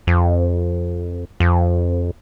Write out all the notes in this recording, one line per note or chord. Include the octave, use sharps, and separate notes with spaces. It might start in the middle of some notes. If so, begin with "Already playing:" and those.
F2
F2